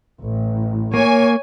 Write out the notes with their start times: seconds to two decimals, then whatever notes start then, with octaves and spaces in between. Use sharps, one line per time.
0.21 A1
0.94 A#3 C#5 G#5